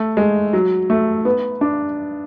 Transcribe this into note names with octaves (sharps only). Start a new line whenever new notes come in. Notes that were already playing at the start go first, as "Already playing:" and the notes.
Already playing: A3
G#3
F#3
A3
B3
D4